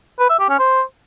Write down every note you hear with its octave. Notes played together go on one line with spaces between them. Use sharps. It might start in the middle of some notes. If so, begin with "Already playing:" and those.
B4
E5
G4
C#4
C5